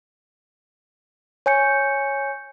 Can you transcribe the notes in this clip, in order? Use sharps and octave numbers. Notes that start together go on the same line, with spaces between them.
C#5 G#5 G6 C#7